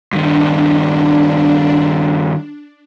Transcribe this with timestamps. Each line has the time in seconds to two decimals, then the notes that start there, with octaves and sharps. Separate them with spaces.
0.13 G2 D#3 D4